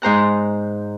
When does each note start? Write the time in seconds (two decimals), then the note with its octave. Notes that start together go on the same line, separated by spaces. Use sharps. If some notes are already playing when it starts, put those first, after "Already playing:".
0.02 G#2 C5 A#5 F#6